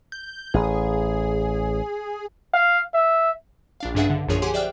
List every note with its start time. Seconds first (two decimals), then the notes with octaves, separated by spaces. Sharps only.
0.12 G6
0.54 A1 G#4
2.54 F5
2.94 E5
3.80 A#1 D4 F5
3.95 G2 C#3 D4 G#4 E5 F#5
4.10 D3
4.28 A#1 F#2 F3 G#4 C#5
4.42 G4 G#4 F#5 G#5 C6 D6
4.54 C5 D5 E5 G5 F6 F#6